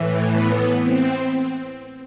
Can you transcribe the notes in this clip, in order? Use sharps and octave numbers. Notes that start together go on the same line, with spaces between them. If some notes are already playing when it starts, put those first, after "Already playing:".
Already playing: A2 E3
B3
C4